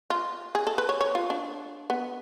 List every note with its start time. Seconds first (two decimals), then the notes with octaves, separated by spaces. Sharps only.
0.10 F4
0.55 G#4
0.67 A4
0.78 B4
0.89 C#5
1.01 C#5
1.15 F4
1.30 D4
1.90 B3